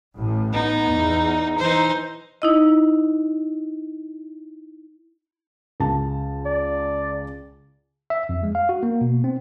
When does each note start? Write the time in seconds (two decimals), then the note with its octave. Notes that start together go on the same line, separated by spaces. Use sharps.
0.17 A1 A2
0.53 B3 D#4
0.90 E2
1.58 E3 D#4 C5
2.42 D#4 E4 D#5
5.80 C#2 A5
6.45 D5
8.10 E5
8.29 F2
8.43 G#3
8.55 F5
8.69 F#4
8.83 A#3
9.01 B2
9.24 C4